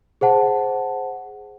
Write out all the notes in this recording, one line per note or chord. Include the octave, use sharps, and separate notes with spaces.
G#4 C5 F#5 A5